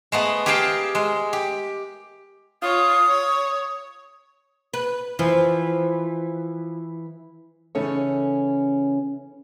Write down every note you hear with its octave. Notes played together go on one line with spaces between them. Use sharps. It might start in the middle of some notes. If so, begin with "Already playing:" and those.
G#3 A3 B3
G4 G#4 A#4 F5 G5 A5
G#3
G4
F4 C#5 D#6
C#5
B4
E3 F3
C#3 E3 C#4 D#4 A4 C#5